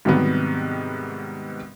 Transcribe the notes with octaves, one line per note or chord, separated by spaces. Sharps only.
G#2 C3 D#3 F#3 G3 B3